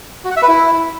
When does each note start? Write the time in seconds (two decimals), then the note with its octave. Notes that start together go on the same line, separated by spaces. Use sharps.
0.25 F#4
0.31 F#5
0.37 E5
0.42 B4
0.48 E4